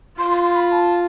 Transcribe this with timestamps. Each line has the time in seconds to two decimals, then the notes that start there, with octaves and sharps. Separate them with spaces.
0.18 F4 C6
0.31 C6
0.44 C6
0.56 B5
0.68 B5
0.72 A5